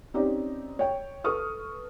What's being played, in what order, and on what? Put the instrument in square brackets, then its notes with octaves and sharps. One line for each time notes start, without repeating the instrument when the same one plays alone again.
[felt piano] C4 C#4 D#4 G4 D5 D#5
C#5 G5
A4 B4 C#6 D#6 F6